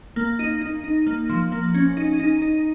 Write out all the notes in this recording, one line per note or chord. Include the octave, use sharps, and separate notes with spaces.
A#3
D#4
D#4
D#4
A#3
F3
A#3
C#4
D#4
D#4
D#4